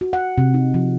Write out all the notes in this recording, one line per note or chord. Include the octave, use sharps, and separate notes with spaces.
F#4
F#5
C3
D#4
F3